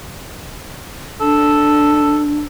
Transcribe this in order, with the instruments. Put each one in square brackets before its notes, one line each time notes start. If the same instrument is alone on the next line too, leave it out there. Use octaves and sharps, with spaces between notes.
[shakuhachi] D4 [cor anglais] A4